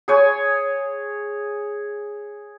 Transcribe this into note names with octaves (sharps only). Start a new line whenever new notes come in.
G#4 C#5 G#5